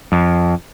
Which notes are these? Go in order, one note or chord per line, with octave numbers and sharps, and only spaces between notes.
F2